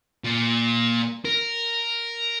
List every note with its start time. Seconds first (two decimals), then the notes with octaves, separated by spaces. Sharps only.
0.24 A#2
1.25 A#4